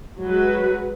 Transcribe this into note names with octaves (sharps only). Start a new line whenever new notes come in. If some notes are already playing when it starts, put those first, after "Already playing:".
F#3 G#3 F#4 B4